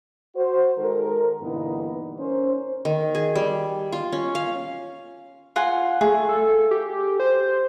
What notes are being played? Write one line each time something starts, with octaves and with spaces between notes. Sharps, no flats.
F#4 C5
D#3 G#3 A4 A#4
G2 A#2 D3 E3 B3 D#4
C#4 A#4 C5
D#3
G#4
G3
F4
C#4
F5
F4 F#5 G#5
A3 G#4
A4
G4
C5